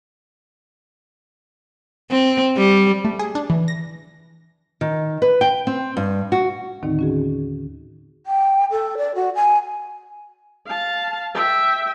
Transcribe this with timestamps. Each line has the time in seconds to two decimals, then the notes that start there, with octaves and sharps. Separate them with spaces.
2.11 C4
2.57 G3
3.05 A3
3.19 G#4
3.35 D4
3.50 E3
3.68 A#6
4.81 D#3
5.22 B4
5.41 G5
5.67 C4
5.97 G2
6.32 F#4
6.83 D#2 A2 D3 D#3 C4 D#4
6.99 C#4 F#4 G#4
8.26 G5
8.71 A4
8.98 D5
9.15 F#4
9.36 G#5
10.67 F5 A5
11.34 E5 G5